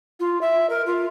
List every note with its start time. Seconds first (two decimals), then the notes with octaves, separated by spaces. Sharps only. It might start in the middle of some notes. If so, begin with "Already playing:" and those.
0.20 F4
0.41 E5
0.70 A#4
0.86 F4